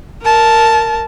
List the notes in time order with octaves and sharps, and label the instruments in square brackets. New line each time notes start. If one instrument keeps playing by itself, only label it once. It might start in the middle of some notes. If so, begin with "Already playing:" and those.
[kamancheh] A#4 A5